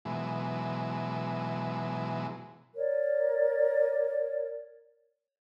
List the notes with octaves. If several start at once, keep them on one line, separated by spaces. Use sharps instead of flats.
B2 E3 F#3 G#3
A#4 C#5 D5